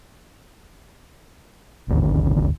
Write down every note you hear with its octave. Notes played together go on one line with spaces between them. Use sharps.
D1 G#1 D#2 D3